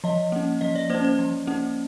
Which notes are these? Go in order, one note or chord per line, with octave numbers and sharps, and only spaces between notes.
F3 D#5
A#3 C#4
F3 D#5
D5
A#3 C#4 C5
C5
F3
A#3 C#4